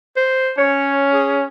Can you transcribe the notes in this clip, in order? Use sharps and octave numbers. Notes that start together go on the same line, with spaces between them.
C5
C#4 C#5
G#4